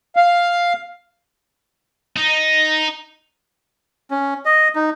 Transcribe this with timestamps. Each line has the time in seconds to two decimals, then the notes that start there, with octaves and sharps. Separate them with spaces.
0.16 F5
2.17 D#4
4.11 C#4
4.45 D#5
4.76 D#4